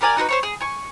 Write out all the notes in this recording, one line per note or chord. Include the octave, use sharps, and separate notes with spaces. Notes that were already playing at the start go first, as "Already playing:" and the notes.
G4 A#4 D5 G#5
D#4 F#4 A#4 B4
C5 C#5 C#6
G#4
G#5 C#6